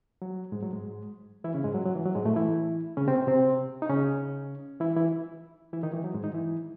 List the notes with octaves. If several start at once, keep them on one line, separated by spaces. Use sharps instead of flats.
F#3
G#2 G#3
F#3
G#2 G#3
E3 E4
C#3 C#4
G#2 G#3
F#3
F#3
E3
F#3
G#2 G#3
A2 A3
E3 E4
C#3 C#4
C3 C4
C3 C4
D#4
C#3 C#4
E3 E4
E3 E4
E3 E4
D#3 D#4
E3
F#3
G#2 G#3
D#3 D#4
E3 E4